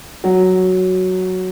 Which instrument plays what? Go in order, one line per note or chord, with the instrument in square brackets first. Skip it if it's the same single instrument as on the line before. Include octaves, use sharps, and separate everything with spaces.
[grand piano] F#3